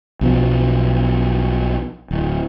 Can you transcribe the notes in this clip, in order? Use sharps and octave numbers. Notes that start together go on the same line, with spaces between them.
B1 B2 F3
D1